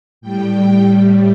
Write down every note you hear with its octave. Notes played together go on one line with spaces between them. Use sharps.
A2 G3 G5